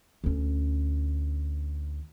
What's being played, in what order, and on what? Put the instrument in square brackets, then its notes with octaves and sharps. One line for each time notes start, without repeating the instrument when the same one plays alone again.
[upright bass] D2 C#4